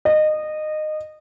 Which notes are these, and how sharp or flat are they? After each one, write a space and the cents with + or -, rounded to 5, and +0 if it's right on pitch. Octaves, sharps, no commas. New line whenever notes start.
D#5 -20